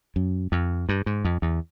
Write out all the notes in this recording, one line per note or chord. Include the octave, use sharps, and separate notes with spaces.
F#2
F2
G2
G#2
F2
E2